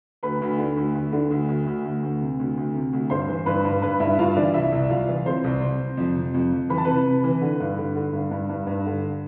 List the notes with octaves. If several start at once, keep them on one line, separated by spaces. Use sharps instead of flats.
D2 B4 B5
D2
D3
D2
D2
D3
D2
D2
D2
D2
D2
C3
D2
D2
C3
D2
G2 C5 C6
E3
G2 B4 B5
G2
G2 B4 B5
G2 E4 E5
G2 F4 F5
E3 D4 D5
C2 E4 E5
C2
C2 F4 F5
E3
C3 C5 C6
C2
C3
C3
F2
C3
F2
F2
E3 B5
A5
C3 B4 B5
C3
E3
D3
G2
D3
D3
G2
G2
G2
G2
D3